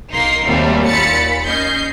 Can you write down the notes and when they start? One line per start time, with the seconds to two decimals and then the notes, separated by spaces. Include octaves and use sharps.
0.11 B1 A#3 D#4 A#4 C6 C7
0.46 D#2 A#2 F#3 G3 A3 C4
0.86 D#2 A#2 B5 A6 C#7
1.15 B5
1.46 C#4 D#5 G6 C7